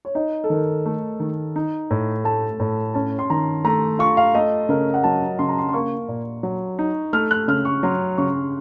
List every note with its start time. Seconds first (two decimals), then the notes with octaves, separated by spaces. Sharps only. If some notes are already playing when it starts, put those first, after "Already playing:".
0.05 C#5
0.15 D#4 D#5
0.44 A4
0.50 D#3 A#4
0.86 A3
1.20 D#3
1.56 D#4
1.91 A2
2.24 A3 A5
2.60 A2
2.94 C#4 A5
3.19 C6
3.30 D#3 A#5
3.65 A3 A#5
3.99 F4 C#6
4.17 F5
4.34 A3 D#5
4.69 C#3 A#4
4.94 F#5
5.04 F#3 A5
5.39 C#3 C6
5.49 A#5
5.58 C6
5.69 C6
5.73 A#3 C#6
6.08 A#2
6.43 F#3
6.79 D#4
7.13 A3 F6
7.31 F#6
7.48 C#3 F6
7.65 C#6
7.83 F#3 C6
8.18 C#3 C#6